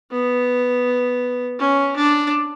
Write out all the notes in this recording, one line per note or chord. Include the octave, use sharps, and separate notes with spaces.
B3
C#4
D4